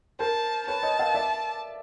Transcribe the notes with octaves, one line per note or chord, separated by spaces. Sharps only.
A#4 C5 A5
B4 C#5 A5
C#5 D#5
D#5 F5
D5 E5